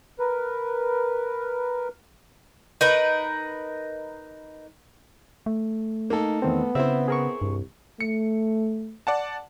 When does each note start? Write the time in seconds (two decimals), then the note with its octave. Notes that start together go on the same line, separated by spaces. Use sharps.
0.19 A#4 B4
2.81 D#4 A#4 B4
5.46 A3
6.10 A#3 D#4 A4
6.42 E2 D#3 B3 C4
6.75 C#3 C4 E4 C5 E5
7.08 G#4 A#4 C#6
7.42 C2 G2
8.01 A3 C#7
9.07 D5 F#5 A5